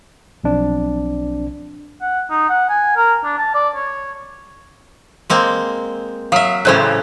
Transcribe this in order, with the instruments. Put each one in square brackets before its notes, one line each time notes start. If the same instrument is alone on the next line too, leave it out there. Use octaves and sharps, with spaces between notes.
[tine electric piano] B1 F3 C4 D4 D5
[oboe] F#5
D#4
F#5
G#5
A#4
D4
A5
D5
C#5
[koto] G#3 A#3 C4
[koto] F#3 E5 [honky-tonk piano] F5 D#6
[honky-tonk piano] A1 C5 F#6 [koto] A2 C#3 C#4